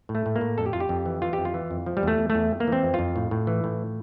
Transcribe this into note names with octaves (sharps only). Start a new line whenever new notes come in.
A2
A3
A2
A#3
A2
F2 A4
G4
F2 F4
G4
F2
E3
E3 F4
G4
F2
F4
E3
F2
F3
G3
E2 A3
E2
E2 A3
F2
A#3
E3 C4
F2
F2 F4
A2
A2
E3
A2